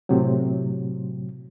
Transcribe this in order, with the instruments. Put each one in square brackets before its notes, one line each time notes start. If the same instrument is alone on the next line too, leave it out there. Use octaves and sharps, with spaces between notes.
[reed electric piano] A2 C3 F#3